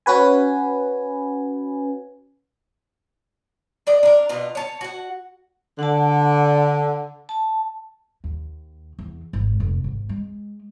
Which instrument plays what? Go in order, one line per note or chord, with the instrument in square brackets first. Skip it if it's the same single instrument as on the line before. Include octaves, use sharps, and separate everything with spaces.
[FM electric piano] C#4 F#4 B4 G#5
[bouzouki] D4 D5 D#5
D4 A#4
B2 D4 F4
C#5 A5
F#4 F#5
[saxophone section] D3 [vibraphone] F#5 A5
[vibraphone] A5
[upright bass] D#2
E2
G#1
F1
G#1
G#3